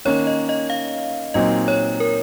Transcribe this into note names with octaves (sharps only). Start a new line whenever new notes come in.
D#3 A#3 C#4 C#5
D#5
D#5
F5
A#2 F#3 C4 D#4 D#5
C#5
A#4